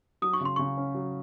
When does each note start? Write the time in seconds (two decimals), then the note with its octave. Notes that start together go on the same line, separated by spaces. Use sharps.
0.22 F#3 D#6
0.33 C#6
0.41 C#3 C6
0.56 C#3 C#6
0.77 C#4
0.95 F#3